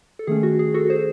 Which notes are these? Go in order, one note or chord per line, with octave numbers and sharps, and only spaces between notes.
A4
D#3 A3 C#4 G#4
F#4
G#4
F#4 A4
G#4 C5